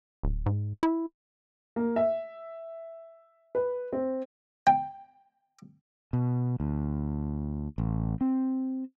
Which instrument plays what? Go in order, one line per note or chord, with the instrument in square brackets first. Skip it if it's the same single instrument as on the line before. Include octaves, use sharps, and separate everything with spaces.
[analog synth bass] D1
G#2
E4
[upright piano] A#3
E5
B4
C4
[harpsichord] G5
[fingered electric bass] B2
D2
A1
C4